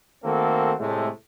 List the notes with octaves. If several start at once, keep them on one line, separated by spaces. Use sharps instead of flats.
D#3 A3 A#3 C4 F#4 A4
A2 C3 G#3 A3